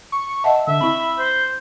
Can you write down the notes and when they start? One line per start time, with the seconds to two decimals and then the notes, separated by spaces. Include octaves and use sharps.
0.12 C#6
0.44 D#5 E5 F#5 A5
0.67 D3 E5
0.81 C4 E4 B5
1.18 C5